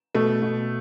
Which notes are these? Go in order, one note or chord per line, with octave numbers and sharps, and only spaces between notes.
B2 A3
B2